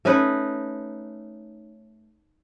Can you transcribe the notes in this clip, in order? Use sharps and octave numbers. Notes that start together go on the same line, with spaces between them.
A3 C#4 D#4 B4